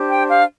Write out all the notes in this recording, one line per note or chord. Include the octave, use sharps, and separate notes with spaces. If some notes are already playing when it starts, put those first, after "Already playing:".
Already playing: D4 G4 C5
G5
F5